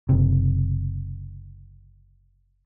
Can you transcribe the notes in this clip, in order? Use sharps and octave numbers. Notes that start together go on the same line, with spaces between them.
F#1 C3